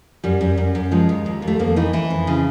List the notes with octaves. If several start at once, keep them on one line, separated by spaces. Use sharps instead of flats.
F#2 G3
F#2
F#2
F#2
F3 G#3
D#2
D#2
D#2
A3
F2 A#3
E3 D#4
E3 E4
F2
C#3